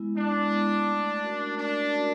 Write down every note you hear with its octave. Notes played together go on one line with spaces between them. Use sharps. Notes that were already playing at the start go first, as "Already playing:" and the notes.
Already playing: G#3 B3 E4
G#3 D4
B3 E4
A3
C#4 F#4 A#4
A3 D4
C#4 F#4 A#4